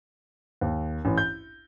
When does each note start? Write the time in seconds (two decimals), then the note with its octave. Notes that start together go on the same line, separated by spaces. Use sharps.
0.61 D#2
1.05 A1
1.18 G6